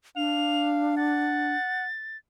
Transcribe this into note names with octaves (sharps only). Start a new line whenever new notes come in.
D4 F5 F7
F#5 A6